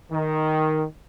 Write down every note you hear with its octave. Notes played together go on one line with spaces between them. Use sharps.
D#3